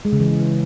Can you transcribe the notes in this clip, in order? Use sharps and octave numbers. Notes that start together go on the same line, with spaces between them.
G#3
C#3
E3